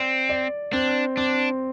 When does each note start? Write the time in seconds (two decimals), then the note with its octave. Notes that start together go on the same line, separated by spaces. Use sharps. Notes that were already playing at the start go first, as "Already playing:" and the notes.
Already playing: C4 D5
0.30 D5
0.73 C4 D4
1.17 C4 D4